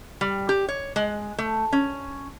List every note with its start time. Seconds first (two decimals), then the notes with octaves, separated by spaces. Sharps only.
0.21 G3
0.49 G4
0.68 C#5
0.96 G#3
1.38 A3
1.72 C#4